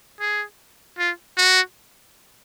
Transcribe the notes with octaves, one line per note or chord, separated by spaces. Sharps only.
G#4
F4
F#4